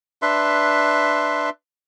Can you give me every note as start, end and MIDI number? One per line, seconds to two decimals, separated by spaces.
0.22 1.50 62
0.22 1.50 71
0.22 1.50 76
0.22 1.50 84